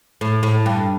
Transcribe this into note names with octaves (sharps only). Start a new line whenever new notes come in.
A2
A2
G2